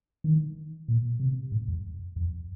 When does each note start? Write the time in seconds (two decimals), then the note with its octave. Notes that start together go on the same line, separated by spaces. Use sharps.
0.24 D#3
0.88 A#2
1.20 C3
1.52 G#2
1.68 F2
2.16 F2